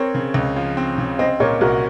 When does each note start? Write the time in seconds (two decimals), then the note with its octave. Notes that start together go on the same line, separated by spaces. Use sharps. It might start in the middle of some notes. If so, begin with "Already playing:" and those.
Already playing: C4 A#4 C#5
0.14 C#3
0.34 C#2
0.56 F3
0.77 C4
0.98 C#3
1.19 C4 C5 D#5
1.40 A#2 A#4 C#5
1.61 C2 F#4 A#4